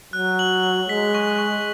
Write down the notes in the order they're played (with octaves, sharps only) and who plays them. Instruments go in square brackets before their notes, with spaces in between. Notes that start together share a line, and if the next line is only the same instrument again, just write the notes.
[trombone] F#3 [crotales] F#6
[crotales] F#7
F#7
[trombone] G#3 [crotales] B6
[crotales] C#6
C#6